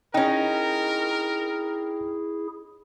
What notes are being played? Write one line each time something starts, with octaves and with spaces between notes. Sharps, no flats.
C#4 D#4 E4 G#4 A#4 G5